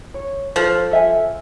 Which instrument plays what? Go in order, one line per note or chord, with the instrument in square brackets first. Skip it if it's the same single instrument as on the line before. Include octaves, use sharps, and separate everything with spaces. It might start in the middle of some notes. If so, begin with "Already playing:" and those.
[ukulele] C#5
[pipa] F3 [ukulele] A4
[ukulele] A4 E5 G#5